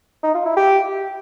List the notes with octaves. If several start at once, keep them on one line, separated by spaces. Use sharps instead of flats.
D#4
F4
E4
G4